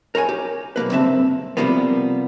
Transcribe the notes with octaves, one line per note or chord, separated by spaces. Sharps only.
A#4 C#5 F#5 G#5
G4
B1 B2 A#3 B4
G2 C#3 C4 E5 A5
C3 D#3 F3 G3 A#3 B3